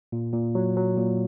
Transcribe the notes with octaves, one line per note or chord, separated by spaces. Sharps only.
A#2
A#2
F#3
F#3
A#2